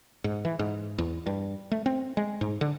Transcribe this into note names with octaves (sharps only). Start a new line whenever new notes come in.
G#2
E3
G#2
E2
G2
A3
C4
G#3
G#2
D3